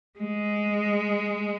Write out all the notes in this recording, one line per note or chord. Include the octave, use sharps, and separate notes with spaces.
G#3